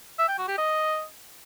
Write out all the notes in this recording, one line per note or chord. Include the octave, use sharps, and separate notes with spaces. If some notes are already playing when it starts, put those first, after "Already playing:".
E5
G5
F#4
G4
D#5